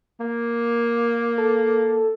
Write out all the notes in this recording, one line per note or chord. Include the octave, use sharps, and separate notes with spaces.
A#3
A4